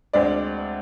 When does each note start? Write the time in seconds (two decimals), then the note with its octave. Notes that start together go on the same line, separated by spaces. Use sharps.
0.13 D2 D3 G#3 C4 D5